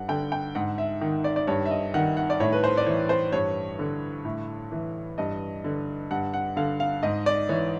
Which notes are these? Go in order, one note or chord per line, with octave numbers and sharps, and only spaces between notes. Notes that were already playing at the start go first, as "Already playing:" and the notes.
Already playing: G2 F#5
D3 G5
G5
G#2 F#5
E5
D#3
D5
D5
G2 C#5
E5
D#5
D#3 F#5
F#5
D5
A2 C#5
B4
C5
D5
E3 C#5
C5
G2 C#5
D3
A2
E3
G2 D#5
D3
G2 F#5
F#5
D3 F5
F5
G#2 D#5
D5
E3 C#5